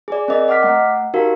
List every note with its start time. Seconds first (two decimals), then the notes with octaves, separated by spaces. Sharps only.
0.08 G#4 D5
0.28 C4 A#4 D#5
0.48 D#5 F#5 D6 F6 B6
0.63 A3 F#5
1.14 D#4 F#4 G4 A#4 F5